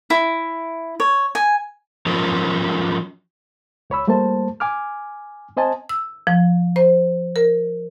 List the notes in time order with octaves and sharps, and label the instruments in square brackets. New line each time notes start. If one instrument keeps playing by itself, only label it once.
[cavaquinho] E4
C#5
G#5
[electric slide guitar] F3 F#3 C#4 F4 A#4
[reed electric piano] C#2 C#5 B5 E6
G3 A3 A#3 C5 A5
G#5 D6 F6
C4 C5 D#5 G#5 A5
[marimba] E6
F3
C5
A#4